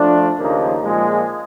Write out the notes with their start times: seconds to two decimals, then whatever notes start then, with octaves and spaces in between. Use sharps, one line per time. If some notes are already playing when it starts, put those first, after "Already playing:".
Already playing: F3 A3 D4
0.38 D#2 C#3 F3 A#3 D#4
0.84 A#2 F3 G#3